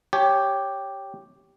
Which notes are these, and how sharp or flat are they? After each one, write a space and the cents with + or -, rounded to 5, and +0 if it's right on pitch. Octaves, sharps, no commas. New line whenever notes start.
G4 +0 C#5 +0 G#5 +35